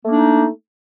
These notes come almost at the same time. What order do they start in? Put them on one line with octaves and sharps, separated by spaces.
A3 A#3 D#4 D4